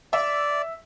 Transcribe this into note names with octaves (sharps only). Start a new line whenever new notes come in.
D5 E5